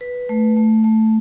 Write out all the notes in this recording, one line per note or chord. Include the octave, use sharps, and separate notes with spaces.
B4
A3
A3
A3